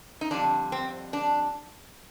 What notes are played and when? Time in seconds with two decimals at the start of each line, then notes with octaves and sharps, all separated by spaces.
0.21 D#4
0.31 F2 D3 G3 D4
0.72 C4
1.13 D4